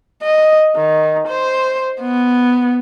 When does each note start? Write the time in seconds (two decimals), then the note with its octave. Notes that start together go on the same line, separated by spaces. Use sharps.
0.22 D#5
0.76 D#3
1.28 C5
2.00 B3